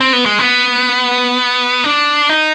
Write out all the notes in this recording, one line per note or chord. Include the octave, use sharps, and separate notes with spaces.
C4
B3
G#3
B3
D4
D#4